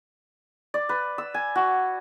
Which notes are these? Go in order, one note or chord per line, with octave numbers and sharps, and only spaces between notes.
D5
B4
E6
G#5
F#4